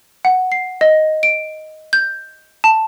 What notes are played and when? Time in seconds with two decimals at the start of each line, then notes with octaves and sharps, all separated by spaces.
0.25 F#5
0.52 C7
0.81 D#5
1.23 D7
1.93 G6
2.64 A5